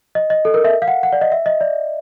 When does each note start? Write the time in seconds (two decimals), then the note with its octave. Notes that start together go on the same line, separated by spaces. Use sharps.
0.15 D#5
0.30 D#5
0.45 A4
0.54 A#4
0.64 E5
0.82 F5
0.88 F#5
1.03 F#5
1.12 D5
1.21 D#5
1.32 E5
1.46 D#5
1.61 D5